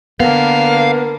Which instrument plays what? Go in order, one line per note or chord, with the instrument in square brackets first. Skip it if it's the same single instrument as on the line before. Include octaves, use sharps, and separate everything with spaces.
[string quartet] D3 A#3 [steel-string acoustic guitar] B3 [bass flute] A#4 [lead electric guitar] F5